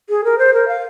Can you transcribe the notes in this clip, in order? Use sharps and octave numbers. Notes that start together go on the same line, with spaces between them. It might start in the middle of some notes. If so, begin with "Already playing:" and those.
G#4
A#4
C5
A#4
F5